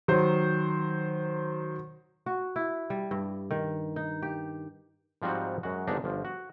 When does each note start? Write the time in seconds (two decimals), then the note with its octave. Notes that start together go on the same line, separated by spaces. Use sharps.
0.08 D#3 F#3 C5
2.26 F#4
2.56 E4
2.90 G3
3.11 G2
3.51 D#3
3.96 D#4
4.22 G4
5.22 G#2 F3 G3 C4 D#4 F#4
5.63 F#2 G#3 F#4
5.87 G1 G#2 D4 D#4 A#5
6.04 G1 F3
6.25 F#4